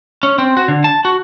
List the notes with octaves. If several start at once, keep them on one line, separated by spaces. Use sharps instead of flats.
C#4
C4
F#4
D3
A5
F#4